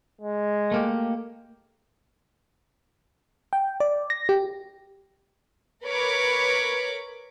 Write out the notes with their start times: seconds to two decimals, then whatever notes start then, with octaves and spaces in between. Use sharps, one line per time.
0.21 G#3
0.71 A3 A#3 G4
3.53 G5
3.80 D5
4.10 A#6
4.29 G4
5.84 A#4 B4 C#5 B5 D6